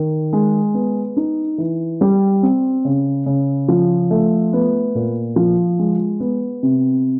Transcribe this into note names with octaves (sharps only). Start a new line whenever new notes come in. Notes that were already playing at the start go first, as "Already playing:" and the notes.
Already playing: D#3
G#3
B3
D#4
E3
G3
C4
C#3
C#3
F3
A3
B3
A#2
F3
G#3
B3
C3